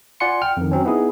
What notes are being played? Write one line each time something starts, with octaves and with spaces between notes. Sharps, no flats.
F4 D5 F#5 G#5 C6 C#7
G5 F6
F2 D#3
F#3 C4 C#4
B3 D#4 E4 G#4